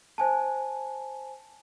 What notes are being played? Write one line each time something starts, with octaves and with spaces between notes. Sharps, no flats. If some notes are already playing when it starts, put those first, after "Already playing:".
C5 G#5 A5